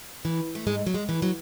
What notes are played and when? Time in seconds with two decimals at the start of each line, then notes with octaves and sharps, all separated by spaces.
0.25 E3
0.55 A3
0.67 G#2 G#3
0.87 F#3
0.94 G#3
1.09 E3
1.22 F#3